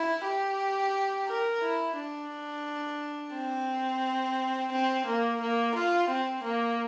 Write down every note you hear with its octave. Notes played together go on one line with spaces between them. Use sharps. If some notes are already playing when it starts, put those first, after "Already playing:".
Already playing: E4
G4
A#4
E4
D4
C4
C4
A#3
A#3
F4
C4
A#3